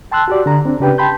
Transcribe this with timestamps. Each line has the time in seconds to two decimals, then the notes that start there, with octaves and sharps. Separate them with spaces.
0.12 G5 A5 C6 E6 F#6
0.28 F#4 G4 D5
0.46 D3 A#5
0.65 C4 D4
0.80 C#3 D4 G4 B4 G5
0.98 G5 A5 B5 C6 G6